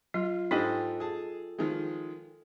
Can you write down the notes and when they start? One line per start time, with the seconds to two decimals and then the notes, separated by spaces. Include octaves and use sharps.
0.14 F#3 F4
0.51 G#2 D4 D#4 G4 A4 D#5 G5
1.00 G#4 A5
1.59 D#3 F3 G#3